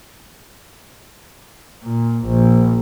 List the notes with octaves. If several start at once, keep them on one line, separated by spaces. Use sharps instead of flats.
A#2
A#1